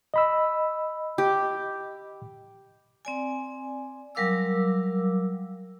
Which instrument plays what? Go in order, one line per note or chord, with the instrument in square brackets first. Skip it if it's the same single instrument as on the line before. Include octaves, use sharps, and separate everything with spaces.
[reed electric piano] D#5 B5 E6
[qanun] G4
[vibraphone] C4 D5 G#5
F#3 G3 A#4 F5 D6 E6